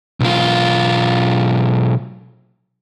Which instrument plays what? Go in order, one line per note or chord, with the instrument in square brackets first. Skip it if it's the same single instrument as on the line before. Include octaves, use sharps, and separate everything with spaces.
[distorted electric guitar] B1 F4